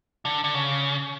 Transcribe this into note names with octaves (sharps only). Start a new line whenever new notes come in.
D3
D3
C#3